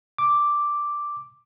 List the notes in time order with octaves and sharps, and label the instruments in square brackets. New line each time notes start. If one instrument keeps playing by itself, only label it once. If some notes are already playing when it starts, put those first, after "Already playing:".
[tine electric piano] D6